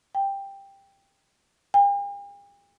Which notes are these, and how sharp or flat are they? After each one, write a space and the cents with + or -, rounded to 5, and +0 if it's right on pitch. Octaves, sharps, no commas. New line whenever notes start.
G5 +10
G5 +45